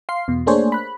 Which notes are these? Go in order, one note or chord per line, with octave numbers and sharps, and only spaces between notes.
F5 C6 C7
E2 B2
A3 A#3 D4 G#4 C5 C#5
B5 F#6